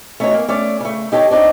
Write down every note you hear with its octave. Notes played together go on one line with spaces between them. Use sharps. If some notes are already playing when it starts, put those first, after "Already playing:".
A3 C#4 D#4 F#4 B4 C#5
A#3
A3 C#4 D5
C#3 A3
D#4 G4 A4 C#5
C4 D4 D#4 C#5